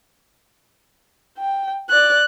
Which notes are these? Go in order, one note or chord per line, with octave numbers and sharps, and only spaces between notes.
G5
D5 F#6